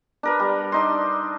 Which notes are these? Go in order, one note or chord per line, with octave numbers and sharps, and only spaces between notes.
D4 A#4 B4
G3
D4 D#4 C6